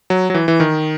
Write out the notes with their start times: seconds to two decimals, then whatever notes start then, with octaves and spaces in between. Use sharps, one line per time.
0.10 F#3
0.30 F#3
0.34 E3
0.48 E3
0.60 D#3